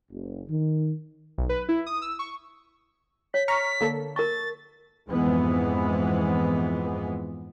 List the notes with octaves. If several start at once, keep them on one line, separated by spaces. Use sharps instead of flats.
F#1
D#3
B1
B4
E4
D#6
E6
C#6
C#5 B6
A#5 C#6 F6 B6
D3 A#3 A4
A#4 A5 C#6 A6
F2 G#2 E3 G#3 B3